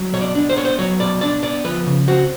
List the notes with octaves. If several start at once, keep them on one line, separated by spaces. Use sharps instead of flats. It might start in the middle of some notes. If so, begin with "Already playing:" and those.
Already playing: F#3
B2 C#5
D5
D4
C5
B3 C#5
C5
F#3 C#5
B2 D5
D4 D5
B3 D5
F3 B4
C#3
C4 F#4